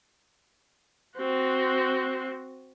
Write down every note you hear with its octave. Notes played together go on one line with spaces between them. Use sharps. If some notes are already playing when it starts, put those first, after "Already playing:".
C4 F#4